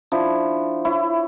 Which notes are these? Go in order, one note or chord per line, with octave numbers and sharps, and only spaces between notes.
F3 D4 E4
E4 C#5